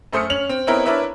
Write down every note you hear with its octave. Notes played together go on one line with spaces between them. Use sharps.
F#2 A3 C5 D#6 F6 C#7
C#4 F7 F#7
C4
B3 C4 D#4 E4 A#4 C#5
D4 E4 A#4 B4 C#5 E5